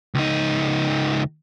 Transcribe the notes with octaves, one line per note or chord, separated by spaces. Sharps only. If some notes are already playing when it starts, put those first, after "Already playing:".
C#2 D#4